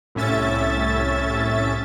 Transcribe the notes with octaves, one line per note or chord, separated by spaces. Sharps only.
C2 A2 C#4 E5 A6